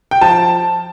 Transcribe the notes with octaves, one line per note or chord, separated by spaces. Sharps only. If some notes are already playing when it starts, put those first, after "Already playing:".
G5
F3 A5